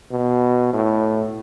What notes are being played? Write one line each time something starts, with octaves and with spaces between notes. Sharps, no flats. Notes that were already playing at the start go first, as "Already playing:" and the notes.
B2
A2